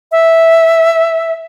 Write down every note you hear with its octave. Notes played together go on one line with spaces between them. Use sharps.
E5